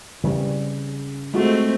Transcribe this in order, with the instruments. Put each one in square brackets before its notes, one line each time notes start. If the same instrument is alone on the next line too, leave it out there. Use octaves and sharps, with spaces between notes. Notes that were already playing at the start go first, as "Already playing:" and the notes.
[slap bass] C#3 [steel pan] E3 G3 C4
[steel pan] G#3 F4 F#4 [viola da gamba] A3 C4